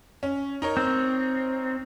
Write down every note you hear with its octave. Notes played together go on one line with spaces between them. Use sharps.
C#4
D#4 A#4 C#5
C4